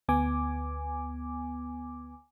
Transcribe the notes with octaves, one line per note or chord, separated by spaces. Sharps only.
D2 B3 G#5 D6